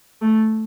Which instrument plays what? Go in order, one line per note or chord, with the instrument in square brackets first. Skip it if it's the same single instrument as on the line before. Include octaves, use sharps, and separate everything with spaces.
[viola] A3